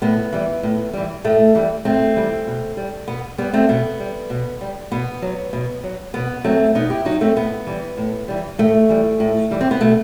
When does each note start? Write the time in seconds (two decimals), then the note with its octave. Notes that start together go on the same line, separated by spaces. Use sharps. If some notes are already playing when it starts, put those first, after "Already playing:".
0.02 A2 B3
0.32 E3 G3
0.63 A2
0.93 E3 G3
1.24 A2 A3
1.55 E3 G3
1.85 A2 A3 C4
2.16 E3 G3
2.47 B2
2.77 G3
3.08 B2 B3
3.38 G3 B3
3.53 A3 C4
3.69 B2 B3
4.00 G3
4.30 B2
4.61 G3
4.92 B2 B3
5.22 F#3
5.53 B2
5.84 F#3
6.14 B2 B3
6.44 F#3 A3 C4
6.75 B2 B3 D#4
6.90 E4 G4
7.05 F#3 D#4 F#4
7.21 A3 C4
7.36 A2 B3
7.67 E3 G3
7.97 A2
8.28 E3 G3
8.58 A2 A3
8.89 E3 G3
9.20 A2
9.51 E3 G3
9.61 C4
9.71 B3
9.81 B2 A3